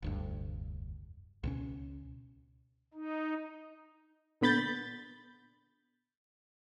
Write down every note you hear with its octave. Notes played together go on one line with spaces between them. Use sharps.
F1 D2 G2
C#2 B2 C#4
D#4
A#2 D3 B3 B5 G6 A6